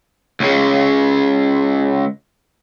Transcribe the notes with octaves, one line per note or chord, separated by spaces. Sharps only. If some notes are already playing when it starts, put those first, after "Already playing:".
C#2 C#3